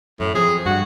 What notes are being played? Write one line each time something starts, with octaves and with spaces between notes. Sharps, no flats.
F#2 A2
F3 C4 G#4
G2 F#4